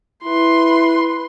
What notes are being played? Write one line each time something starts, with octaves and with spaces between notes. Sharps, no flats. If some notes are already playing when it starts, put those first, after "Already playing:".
E4 B4 C6